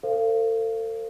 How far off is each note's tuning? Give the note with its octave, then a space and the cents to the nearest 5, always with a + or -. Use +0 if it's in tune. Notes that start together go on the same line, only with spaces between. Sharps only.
A4 +40 C5 +0 F5 -25